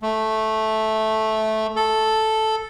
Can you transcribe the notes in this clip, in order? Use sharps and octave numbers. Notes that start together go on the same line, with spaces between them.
A3
A4